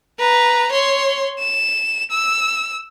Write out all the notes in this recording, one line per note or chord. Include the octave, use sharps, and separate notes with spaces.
B4 A#5
C#5 C6
E7
E6